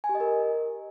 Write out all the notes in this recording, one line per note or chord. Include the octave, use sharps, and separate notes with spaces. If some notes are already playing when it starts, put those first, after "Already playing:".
G#5
G4
D#5
A#4